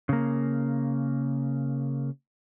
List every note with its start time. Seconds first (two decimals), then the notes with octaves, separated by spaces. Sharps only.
0.09 C#3 A#3